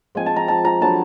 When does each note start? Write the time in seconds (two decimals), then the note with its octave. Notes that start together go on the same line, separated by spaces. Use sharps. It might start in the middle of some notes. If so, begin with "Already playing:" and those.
0.15 F3 G#3 C4 G#5
0.26 A5
0.36 A#5
0.48 A5
0.65 A#5
0.81 D3 F#3 B3 A5